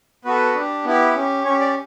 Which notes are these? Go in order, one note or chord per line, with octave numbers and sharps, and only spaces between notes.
B3 F#4 A4 B4
D4 G4
B3 E4 G4
C#4 G4
C#4 G4 C#5
D5